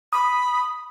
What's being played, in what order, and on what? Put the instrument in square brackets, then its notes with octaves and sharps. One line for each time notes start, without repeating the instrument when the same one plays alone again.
[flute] B5 [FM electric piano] D#6